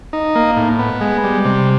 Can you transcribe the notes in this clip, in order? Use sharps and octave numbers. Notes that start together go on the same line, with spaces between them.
D#4
A#3
A2
B3
G#3
G3
C3